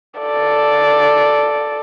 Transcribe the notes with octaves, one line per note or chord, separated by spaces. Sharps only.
A4 D5